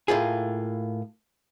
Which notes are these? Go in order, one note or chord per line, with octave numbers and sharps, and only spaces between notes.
A2 A#3 F4 G#4